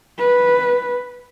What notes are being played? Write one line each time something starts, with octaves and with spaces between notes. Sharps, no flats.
B4